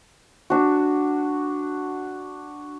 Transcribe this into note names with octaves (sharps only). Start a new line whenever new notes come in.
D4 F#4